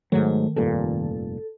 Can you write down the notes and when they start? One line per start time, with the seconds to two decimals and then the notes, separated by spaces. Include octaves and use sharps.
0.12 G#2 D#3 F#3 A3
0.56 F1 G2 A#2 A4